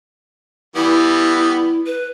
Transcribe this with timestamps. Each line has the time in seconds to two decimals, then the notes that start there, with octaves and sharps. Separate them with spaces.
0.76 E3 G3 B3 E4
1.86 B4